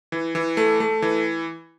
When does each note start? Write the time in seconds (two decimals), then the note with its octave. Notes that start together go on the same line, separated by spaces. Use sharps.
0.12 E3
0.35 E3
0.57 A3
0.80 A3
1.02 E3